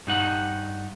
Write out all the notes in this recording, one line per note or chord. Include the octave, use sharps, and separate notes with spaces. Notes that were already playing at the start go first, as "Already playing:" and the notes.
G2 D#4 F#5